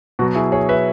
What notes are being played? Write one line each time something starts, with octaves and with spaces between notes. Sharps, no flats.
B2 F#3 F#4
E4 G#4
G#4 C#5
B4 E5